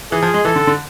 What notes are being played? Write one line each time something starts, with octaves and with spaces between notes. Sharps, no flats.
E3 G#4
F3
G#3
E3 A4
D3
D3